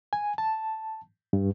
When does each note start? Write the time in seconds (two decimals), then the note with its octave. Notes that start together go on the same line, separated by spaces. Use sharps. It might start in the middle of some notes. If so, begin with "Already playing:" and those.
0.13 G#5
0.38 A5
1.33 G2